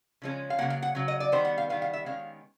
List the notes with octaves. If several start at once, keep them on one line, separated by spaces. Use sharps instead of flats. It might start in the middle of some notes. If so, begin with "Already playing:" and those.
C#3 F3 G#3 C#4
F5
C#3 F#3 A#3 F#5
F5
F#5
C#3 F#3
D#5
D5
D#3 G3 B3 C5
F#5
F5
D#3 G3 B3 F5
F5
E5
D#3 G#3 C#4 F5